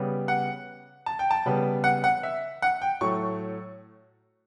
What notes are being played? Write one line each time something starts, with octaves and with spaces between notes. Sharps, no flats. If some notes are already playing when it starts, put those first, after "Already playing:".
Already playing: C#3 G3 B3
F#5
A5
G5
A5
C#3 G3 B3
F#5
F#5
E5
F#5
G5
A2 F#3 A3 C#6